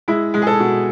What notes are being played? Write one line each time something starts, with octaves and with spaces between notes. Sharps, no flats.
G#3 E4
G#3
G#4
A4
B2